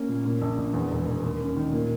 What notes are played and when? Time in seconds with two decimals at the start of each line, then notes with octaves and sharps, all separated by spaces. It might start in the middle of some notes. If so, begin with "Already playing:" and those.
Already playing: A#3 C#4
0.09 A#2
0.25 A#2
0.42 A#1
0.58 A#1
0.73 E2
0.91 E1
1.07 E1
1.23 D#2
1.40 C#4
1.56 D#3
1.72 A#2